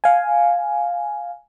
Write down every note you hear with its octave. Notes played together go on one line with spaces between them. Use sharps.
F5 G#5